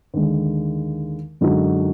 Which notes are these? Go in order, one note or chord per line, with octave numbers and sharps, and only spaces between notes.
D#2 D3 G#3
F#2 D3 G#3 D#4 F#4